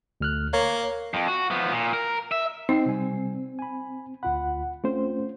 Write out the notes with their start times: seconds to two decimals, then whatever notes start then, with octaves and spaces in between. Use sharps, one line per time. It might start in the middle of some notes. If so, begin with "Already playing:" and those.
0.21 D2 F6 F#6
0.53 A#3 C#5
1.14 F2
1.28 F#4
1.51 F3 B3
1.72 A#2
1.93 A#4
2.32 E5
2.69 C4 D#4 D#5 G5 C7
2.86 C3 G3 G#5
3.59 G#5 B5
4.23 D2 F4 F#5 B5
4.84 A3 C4 C#4 F4 C5